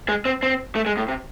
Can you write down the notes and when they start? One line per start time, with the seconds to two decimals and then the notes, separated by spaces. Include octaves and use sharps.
0.09 G#3
0.25 C4
0.43 C4
0.75 A3
0.86 G#3
0.97 A2
1.08 C3